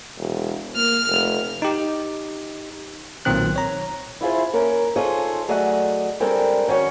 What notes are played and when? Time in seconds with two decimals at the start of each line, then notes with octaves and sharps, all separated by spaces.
0.17 E1
0.75 A#3 F6
1.06 F1
1.62 D#4 G4
3.25 B1 A#2 D#3 C4 F#6
3.56 C#5 A#5
4.21 E4 F4 G#4 C5
4.53 A#3 C#4 A#4
4.96 D#4 F4 G#4 A4 C5 C#5
5.48 F#3 A3 G#4 D5 D#5 F#5
6.20 G3 G#3 C4 D4 A4 A#4
6.68 D#3 C#4 F#4 C#5